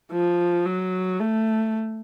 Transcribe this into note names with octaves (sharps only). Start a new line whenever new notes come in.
F3
F#3
A3